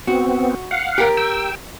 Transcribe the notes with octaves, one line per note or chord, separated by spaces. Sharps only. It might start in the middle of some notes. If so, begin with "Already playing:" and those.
B3 C4 F#4
F5 F#5
G4 A#4
G5 E6